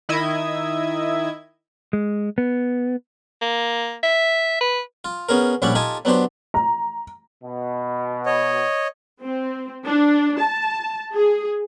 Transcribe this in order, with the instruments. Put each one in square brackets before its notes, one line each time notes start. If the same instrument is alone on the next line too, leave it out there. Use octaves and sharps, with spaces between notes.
[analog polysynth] D#3 E4 D#5 E5 G#6
[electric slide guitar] G#3
B3
[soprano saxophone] A#3
E5
B4
[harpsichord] F4
B3 C#4 G#4 A#4
A#1 G3 C#4 E4 D5 F#5
D#4 F4 G4 A4 G#5 A5
F#3 B3 D4 G4 C5
[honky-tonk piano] A#5
[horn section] B2
[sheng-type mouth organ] C#5 D#5
[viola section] C4
D4
A5
G#4